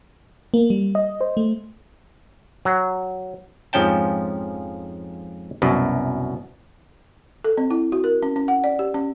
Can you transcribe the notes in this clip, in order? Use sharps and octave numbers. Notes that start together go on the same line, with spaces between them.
A#3
G3
D#5
C5
A3
F#3
F2 G#2 F3 C#4 G5 A5
C2 F#2 B2
A4
C4
E4
F#4
A#4
C#4
C#4
F#5
D5
G4
C#4